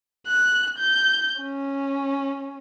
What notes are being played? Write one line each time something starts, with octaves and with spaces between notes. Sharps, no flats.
F#6
G6
C#4